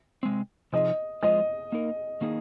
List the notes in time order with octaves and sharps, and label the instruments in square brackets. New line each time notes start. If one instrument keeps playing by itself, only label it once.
[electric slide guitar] C3 G#3 C4
[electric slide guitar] C3 F3 D#4 G#4 [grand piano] D#5
[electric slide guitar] F3 G#3 F4 G#4 C5 [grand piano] D#5
[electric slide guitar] A#3 D#4 A#4
D#3 A#3 D#4 G#4